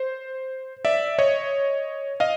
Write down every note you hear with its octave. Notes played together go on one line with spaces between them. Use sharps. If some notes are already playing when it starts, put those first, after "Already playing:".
Already playing: C5
D5 E5
C#5 D#5
D#5 F5